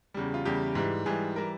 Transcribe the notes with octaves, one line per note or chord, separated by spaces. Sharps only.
E2 C#3 G3
F4
E2 C#3 G3 G4
G#2 E3 G3
G#2 E3 G3 G#4
E3 G3 A#4